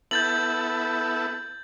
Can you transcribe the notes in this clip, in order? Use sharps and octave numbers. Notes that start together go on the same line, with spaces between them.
B3 E4 A4 G6 A6 F#7